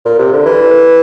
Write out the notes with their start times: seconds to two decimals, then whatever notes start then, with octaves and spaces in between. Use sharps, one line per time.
0.05 A#2
0.19 C3
0.32 D3
0.46 E3